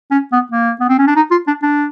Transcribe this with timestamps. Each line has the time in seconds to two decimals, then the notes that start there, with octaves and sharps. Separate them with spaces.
0.11 C#4
0.32 B3
0.52 A#3
0.81 B3
0.89 C4
0.98 C#4
1.07 D4
1.16 D#4
1.31 F4
1.47 D4
1.63 D4